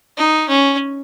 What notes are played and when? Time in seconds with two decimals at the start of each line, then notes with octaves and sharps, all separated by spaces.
0.17 D#4
0.48 C#4